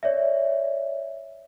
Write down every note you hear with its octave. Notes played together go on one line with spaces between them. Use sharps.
C#5 D5 E5